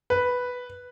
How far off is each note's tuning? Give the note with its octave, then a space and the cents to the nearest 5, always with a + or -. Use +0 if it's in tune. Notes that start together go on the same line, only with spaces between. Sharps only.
B4 +0